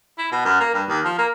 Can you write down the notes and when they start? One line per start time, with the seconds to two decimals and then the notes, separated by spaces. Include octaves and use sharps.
0.18 E4
0.32 B2
0.45 F#2
0.60 A#3
0.74 G2
0.89 D#2
1.05 F3
1.18 A#3